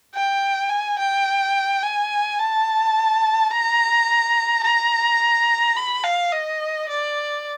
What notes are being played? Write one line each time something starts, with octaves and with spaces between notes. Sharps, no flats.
G5
G#5
G5
G#5
A5
A#5
A#5
B5
F5
D#5
D5